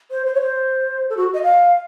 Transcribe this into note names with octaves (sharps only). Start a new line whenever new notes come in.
C5
C5
C#5
C5
A4
F#4
D#5
F5